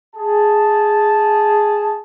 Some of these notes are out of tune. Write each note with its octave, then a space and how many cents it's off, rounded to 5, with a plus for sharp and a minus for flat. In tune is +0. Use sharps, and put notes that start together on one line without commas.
G#4 +0 A5 -5